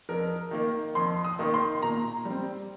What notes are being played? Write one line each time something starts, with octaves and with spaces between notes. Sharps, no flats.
F2 A#4
D#3 A#3
F2 C6
D#6
D#3 A#3
C6
A#2 A#5
G3 C4